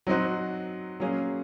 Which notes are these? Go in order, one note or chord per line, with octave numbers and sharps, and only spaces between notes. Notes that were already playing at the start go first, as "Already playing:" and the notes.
F#3 C4 D#4 F#4 C5
F#3 A#3 C#4 F4 G#4